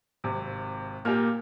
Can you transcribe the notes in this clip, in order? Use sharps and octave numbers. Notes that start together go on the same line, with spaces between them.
G#1 C3
A#2 A#3 G4 F6